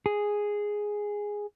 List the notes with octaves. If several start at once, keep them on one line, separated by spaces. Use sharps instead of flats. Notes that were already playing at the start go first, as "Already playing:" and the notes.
G#4